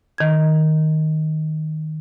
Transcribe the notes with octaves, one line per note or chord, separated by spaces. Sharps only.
D#3 G#6